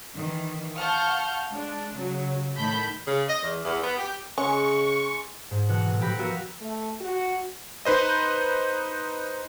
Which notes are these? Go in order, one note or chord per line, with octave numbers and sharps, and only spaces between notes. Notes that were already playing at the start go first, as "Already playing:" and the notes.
D#3 E3
F5 F#5 A5 C#6 F6 G6
G#3 D4
C#3 F#3
A2 D#3 A5 B5 G6 B6
C#3
D#5
E2
E2
B3
G4
C#3 G#3 C#4 C#6
G#2
B2 E3 F#4 F#5 F6
A2 F#3
F3 F#3 G4 F#5 B5 A#6
B3 F#4 G4 A#4 E5 F5
A3
F#4
D#4 B4 C5 D#5